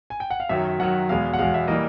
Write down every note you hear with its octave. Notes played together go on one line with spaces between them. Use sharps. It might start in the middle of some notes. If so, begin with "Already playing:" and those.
G#5
G5
F#5
F5
F#2 D#3 F#3 E5
F#2 D#3 F#3 F#5
E2 B2 G#3 F5
F#5
E2 B2 G#3 F5
E5
E3 G3 A#3 D#5